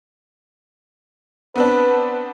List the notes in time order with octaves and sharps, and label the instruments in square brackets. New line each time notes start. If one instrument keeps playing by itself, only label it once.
[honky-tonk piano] B3 C4 D4 [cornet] B4